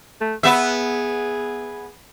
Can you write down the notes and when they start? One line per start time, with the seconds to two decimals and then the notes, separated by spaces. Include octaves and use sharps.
0.21 A3
0.43 B3 G#4 E5